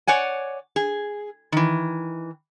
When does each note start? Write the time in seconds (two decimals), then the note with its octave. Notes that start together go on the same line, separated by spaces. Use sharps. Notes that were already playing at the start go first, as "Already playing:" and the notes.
0.07 C#5 D5 F#5 G#5
0.76 G#4
1.52 D#3 E3